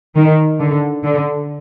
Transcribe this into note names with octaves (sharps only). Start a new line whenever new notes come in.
D#3
D3
D3